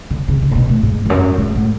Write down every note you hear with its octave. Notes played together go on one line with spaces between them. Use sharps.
D3
C#3
C#3
A2
B2
A2
G#2
E2
F#2
G#2
A2